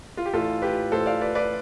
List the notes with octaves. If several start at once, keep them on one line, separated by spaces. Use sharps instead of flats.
F4
G4
A1 A2 E3 F4 A4
G4 B4
A1 A2 E3 A4 C5
D5 F5
B4 D5
B4 D5